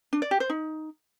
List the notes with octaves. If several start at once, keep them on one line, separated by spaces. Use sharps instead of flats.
D4
D5
G4
C5
D#4